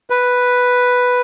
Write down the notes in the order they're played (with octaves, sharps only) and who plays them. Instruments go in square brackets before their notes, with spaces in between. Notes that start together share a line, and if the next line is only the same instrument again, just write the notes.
[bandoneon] B4